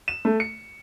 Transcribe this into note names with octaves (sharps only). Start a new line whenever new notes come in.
E7
A3
C#7